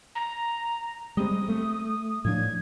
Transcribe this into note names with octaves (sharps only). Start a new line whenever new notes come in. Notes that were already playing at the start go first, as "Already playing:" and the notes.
A#5
G3 G#3 C4 D#6
A3
A2 F3 D4 G#6